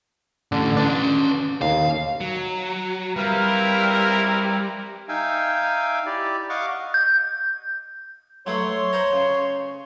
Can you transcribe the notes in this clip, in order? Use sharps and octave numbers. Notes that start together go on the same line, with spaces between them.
A2 D3 C#4
C#4 D4 B4
D#2 F5
F#3
G3 C4 E4 A#4 B4 E5 F5
D#4 E5 F5 G5 G#5
E4 G4 D5
D#5 F5 F#5 C#6 D6
G6
F#3 A3 B4 C#5 C6
B4 C5 A#5
C#3